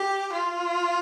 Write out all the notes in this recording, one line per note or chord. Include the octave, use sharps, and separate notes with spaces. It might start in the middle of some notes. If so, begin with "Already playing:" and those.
Already playing: G4
F4